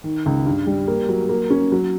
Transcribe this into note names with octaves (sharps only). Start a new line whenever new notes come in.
D#3
C#2
G2
G3
A#3
F#3
A#3
C#4
F#3